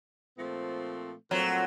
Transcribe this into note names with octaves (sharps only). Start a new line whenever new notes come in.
A#2 F3 A3 C4
A#2 F3 F#3 A3 C4